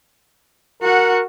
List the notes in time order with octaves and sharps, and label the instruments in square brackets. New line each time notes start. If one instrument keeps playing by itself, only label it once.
[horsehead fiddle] F#4 F#5 [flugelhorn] A#4